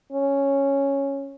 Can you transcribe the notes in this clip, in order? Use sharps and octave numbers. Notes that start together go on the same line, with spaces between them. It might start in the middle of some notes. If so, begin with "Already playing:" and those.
C#4